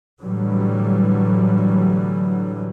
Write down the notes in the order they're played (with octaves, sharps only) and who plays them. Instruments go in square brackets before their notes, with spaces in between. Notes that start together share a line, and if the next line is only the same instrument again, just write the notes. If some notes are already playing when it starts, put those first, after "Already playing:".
[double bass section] A2 D3 E3 F#3 G3